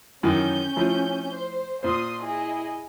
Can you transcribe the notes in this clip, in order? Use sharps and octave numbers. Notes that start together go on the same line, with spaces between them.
F#2 D#3 E3 C#4 G6
A2 F3
C5
A#2 C5 C6 D#6
E4 G#4 D#5